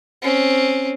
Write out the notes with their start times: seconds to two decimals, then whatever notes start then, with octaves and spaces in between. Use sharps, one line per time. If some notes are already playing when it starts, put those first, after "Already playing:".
0.22 C4 C#4